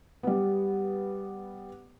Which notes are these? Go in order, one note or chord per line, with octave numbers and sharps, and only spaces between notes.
G3 B3